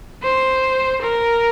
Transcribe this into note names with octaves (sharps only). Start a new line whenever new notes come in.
C5
A#4